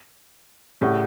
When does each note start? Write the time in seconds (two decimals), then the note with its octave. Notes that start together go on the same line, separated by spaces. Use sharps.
0.81 A2 C#3 G4 D5 F#5